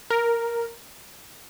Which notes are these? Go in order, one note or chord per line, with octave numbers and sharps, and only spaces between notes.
A#4